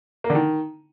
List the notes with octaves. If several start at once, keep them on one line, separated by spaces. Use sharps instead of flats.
A#3
D3
D#3